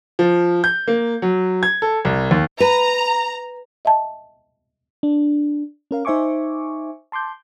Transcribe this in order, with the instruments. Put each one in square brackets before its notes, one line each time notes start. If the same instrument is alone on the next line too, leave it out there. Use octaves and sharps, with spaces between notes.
[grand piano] F3
G6
A#3
F#3
G#6
A4
C2
D#2
[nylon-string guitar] B4 [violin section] A#5
[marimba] D#5 E5 G5 A5
[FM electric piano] D4
C#4 A#4 F5
D#4 C5 E5 G#5 C#6 D6
A5 C6 D6 G6